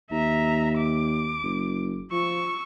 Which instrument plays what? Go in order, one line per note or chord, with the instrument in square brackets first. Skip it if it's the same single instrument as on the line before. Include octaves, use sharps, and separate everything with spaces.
[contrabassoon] D#2 [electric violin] E5 A#5
[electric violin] D6
[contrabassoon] F#1
[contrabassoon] F3 [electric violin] C#6 E6